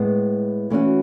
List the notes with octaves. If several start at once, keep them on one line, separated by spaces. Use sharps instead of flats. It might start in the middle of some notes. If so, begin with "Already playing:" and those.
Already playing: A2 G#3 B3
E3 A3 C#4 F#4